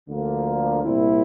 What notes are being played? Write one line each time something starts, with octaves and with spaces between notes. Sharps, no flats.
D2 D3 F3 A#3
C2 A#2 G3 C4 E4